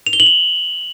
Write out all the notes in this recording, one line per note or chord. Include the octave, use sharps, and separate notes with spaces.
F7
G7
F#7
F7